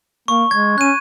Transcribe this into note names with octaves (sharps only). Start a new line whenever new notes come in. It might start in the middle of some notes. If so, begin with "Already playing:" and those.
A#3 C#6
G#3 G#6
C#4 F#6 D#7